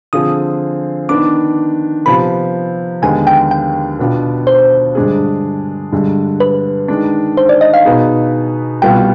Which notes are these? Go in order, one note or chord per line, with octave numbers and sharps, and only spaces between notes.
D3 F3 C4 F4 G#4 D#6
D#3 B3 D4 D6
C3 F3 B3 B5
D#2 D3 G#3 B3 G#5
G5
G5
B2 B3 D4 F4
C5
G2 D3 G#3 D4 G#4
G2 D3 G#3
B4
D#3 G#3 D4
C5
D5
D#5
F5
B2 B3 D#4 G#4
C2 B2 G3 B3 F4 G5